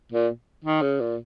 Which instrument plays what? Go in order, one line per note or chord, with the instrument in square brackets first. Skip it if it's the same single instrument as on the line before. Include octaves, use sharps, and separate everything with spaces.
[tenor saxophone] A#2
D#3
C#3
A#2